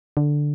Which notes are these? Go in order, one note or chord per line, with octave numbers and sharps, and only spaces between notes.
D3